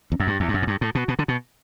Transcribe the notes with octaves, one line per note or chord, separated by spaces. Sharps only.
E2
F#2
G2
E2
G2
F#2
A2
G2
A2
B2
B2
D3
B2